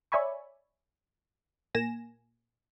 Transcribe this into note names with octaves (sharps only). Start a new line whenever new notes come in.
C#5 D5 E5 G#5 B5 C#6
A#2 A#3 G#5 A#6 E7